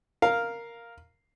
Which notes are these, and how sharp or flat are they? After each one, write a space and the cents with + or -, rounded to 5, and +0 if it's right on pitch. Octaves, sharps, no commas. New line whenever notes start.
A#4 +0 F5 +0